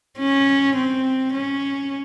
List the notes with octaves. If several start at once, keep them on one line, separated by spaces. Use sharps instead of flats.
C#4
C4
C#4